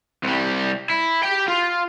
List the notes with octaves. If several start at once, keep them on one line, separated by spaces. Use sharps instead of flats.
C2 G3
E4
G4 G5
F4